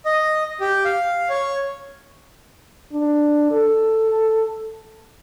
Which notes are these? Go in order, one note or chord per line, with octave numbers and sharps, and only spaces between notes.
D#5
G4
F5
C#5
D4
A4